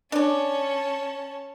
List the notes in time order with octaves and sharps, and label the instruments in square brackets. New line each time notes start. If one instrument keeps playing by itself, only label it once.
[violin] C#4 A5 [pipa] D4 D5